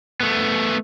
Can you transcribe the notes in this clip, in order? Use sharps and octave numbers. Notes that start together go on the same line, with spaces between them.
A3 B3